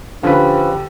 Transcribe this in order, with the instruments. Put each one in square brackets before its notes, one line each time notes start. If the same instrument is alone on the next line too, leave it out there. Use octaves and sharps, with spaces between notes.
[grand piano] D3 [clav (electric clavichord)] F3 C#4 B4 [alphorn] G4